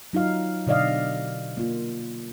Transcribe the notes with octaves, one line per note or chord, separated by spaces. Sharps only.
F#3 D#4 F4 F5
B2 D3 D5 D#5 F5
A#3 F4